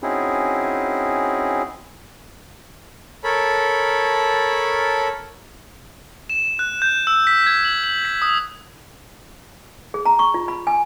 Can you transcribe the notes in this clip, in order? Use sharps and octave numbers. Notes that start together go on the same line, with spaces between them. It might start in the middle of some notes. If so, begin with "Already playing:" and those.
C4 C#4 D#4 E4 F#4 G#4
A4 A#4 C#5 A5 B5
E7
F#6
G6
E6
B6
G#6
F#7
F#7
B6
D#6
G#4
A#5
C#6
F4
B5
G#5